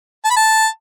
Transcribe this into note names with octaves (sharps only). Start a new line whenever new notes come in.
A5
B5
A5